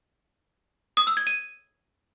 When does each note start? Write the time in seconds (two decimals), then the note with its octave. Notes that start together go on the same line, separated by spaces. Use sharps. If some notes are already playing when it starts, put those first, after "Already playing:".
0.97 D#6
1.07 E6
1.17 G#6
1.27 D#7